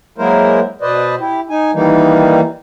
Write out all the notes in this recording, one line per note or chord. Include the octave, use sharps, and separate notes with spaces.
F#3 G#3 A#3 E4 A#4 C5
B2 B4 C5 D5 D#5
E4 G4
D#4 G#5
D#3 E3 G3 A#3 D#4